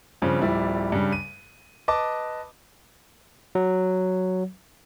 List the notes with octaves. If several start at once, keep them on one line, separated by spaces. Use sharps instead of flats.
G2 C#3 F3 C4
D1 F3 G3 E4 D5
G2 C#3 G3
D#7
B4 D#5 A5 D6
F#3